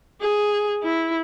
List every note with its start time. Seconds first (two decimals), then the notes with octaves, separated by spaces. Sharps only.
0.21 G#4
0.84 E4